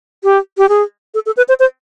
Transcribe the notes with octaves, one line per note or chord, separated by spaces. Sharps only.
G4
G4
G#4
A4
A4
B4
C5
C5